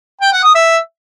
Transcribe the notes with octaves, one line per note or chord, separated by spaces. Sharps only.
G5
F#5
D#6
E5